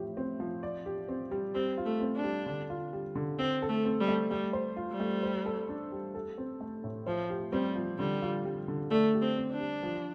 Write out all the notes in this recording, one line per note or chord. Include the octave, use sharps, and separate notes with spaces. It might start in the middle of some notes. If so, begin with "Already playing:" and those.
Already playing: A2 F3 G4
C4
F3
D5
G4
C4
G3
G3 C4
F4
A3
C4
D4
G3
D3
F4
G3
D3
C4 C5
A4
A3
C4
G3
A3
G3 A3
C5
F4
G3
A3
C5
A4
D4
G3
A4
C4
A3
A2
F3 C5
G4
G3 C4
F3
D3 G3
F4
G3
D3
A3 D5
G4
C4
C4
D4
G3
F3